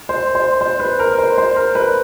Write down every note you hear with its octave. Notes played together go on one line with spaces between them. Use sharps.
C5
C5
C5
B4
A#4
C5
C5
A#4
B4